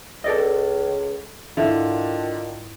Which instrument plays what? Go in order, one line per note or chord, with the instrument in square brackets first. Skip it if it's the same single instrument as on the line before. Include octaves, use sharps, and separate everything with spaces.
[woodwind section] C#2 [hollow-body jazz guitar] A4 D5 D#5
[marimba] G#2 E4 E5 [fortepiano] D3 [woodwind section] D#3 D4 F4